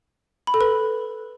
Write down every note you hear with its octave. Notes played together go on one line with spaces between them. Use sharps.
B5
A4
B4